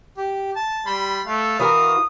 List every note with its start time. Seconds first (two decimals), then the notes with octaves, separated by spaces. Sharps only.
0.17 G4
0.56 A5
0.86 G3 B5 C6
1.26 A3 F5
1.60 E3 F#4 A#4 D#6